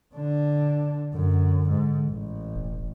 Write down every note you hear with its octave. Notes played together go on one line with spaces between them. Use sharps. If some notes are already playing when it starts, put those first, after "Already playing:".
D3 D4
F#2 D3
G#2
A1
E1